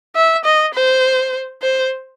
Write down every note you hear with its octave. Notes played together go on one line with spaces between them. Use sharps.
E5
D#5
C5
C5